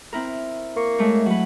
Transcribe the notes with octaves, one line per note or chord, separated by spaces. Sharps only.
C4 E4 A#4
A#3 C#6
G#3 A3 C#5
F#3 B4